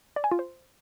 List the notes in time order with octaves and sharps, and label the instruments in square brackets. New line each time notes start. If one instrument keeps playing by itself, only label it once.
[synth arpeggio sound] D5
G#5
F4
C5